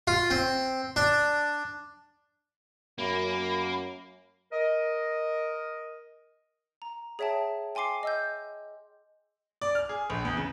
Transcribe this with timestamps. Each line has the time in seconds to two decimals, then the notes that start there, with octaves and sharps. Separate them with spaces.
0.07 F4
0.30 C4
0.96 D4
2.98 F#2 A#3 B5
4.52 A#4 D#5
6.82 A#5
7.19 G#4 C#5 E5 G5 A5
7.75 G5 G#5 C6 D6 C7
8.03 D#5 E6 G6
9.62 D5
9.75 F6
9.89 G#4
10.10 A#1
10.25 E2
10.37 C#3